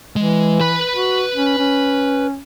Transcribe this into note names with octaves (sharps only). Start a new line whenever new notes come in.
E3 G#3
B4 B5
F#4
C#4
C#4